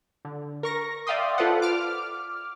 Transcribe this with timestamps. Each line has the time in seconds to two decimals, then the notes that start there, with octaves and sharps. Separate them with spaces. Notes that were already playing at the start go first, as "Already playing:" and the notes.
0.25 D3
0.63 A#4 C#6 A#6
1.07 D5 E5 F5 G5 C6 D#6
1.38 F4 A4 B4 C5 D5 F#5
1.62 D6 F6